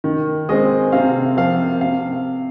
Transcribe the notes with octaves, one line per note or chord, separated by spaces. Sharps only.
D#3
G#3 C4 D#5
C3 F5
F3 C4 F5
C3 F5